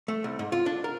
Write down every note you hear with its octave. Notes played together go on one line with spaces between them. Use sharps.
A3
C2
G#2
F4
D4
A#4